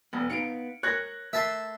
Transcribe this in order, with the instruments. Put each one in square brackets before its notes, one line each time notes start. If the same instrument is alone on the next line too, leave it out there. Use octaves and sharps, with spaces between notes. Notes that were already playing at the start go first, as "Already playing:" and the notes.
[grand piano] F1 [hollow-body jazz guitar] B3
[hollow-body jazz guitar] B3 D#4 F5 [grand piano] C#7 D7
[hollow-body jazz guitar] A#4 C#5 [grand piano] F#6 G#6 A#6
[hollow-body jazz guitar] A3 A#4 [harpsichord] E5 A5 C6